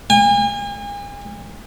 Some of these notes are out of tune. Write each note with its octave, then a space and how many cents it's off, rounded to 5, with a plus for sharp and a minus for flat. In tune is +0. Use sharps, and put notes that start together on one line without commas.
G#5 -40